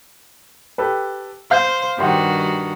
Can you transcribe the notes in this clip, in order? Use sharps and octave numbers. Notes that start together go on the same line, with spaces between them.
G4 A4 B4
C5 F5 G6
G2 D#3 F#4 G4 C5 F#5